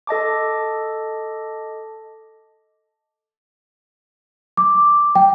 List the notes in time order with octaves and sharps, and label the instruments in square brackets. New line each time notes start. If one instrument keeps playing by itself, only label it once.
[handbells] A4 D#5 A5 D6
[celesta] D6
G5